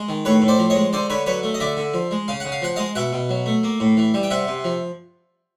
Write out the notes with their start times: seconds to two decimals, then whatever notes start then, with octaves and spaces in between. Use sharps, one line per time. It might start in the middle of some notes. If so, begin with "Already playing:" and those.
Already playing: G#3
0.09 D#3
0.25 A2 B4 C#5
0.42 A2
0.48 C5 D5
0.59 F3
0.70 C#5 D#5
0.76 G#3
0.93 D3 C5 D5
1.10 D3 B4 C#5
1.26 F#3 B4 C#5
1.43 A3
1.54 D#5
1.60 D3 D5 E5
1.77 D3
1.94 F3
2.11 G#3
2.28 C#3 F5
2.40 C#3 F#5
2.52 F5
2.62 F3 F#5
2.76 G#3 D#5 F5
2.95 B2 E5 F#5
3.13 B2
3.29 F#3
3.46 A3
3.63 A#3
3.80 A2
3.97 E3
4.14 G3
4.23 G5
4.30 C3 E5 F#5
4.47 C3
4.64 F3